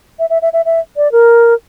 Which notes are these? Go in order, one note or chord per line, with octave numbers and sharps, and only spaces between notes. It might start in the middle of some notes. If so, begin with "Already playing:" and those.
E5
E5
E5
E5
E5
D5
A#4